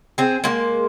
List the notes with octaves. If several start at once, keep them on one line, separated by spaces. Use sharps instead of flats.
C4 G#4
G#3 A#3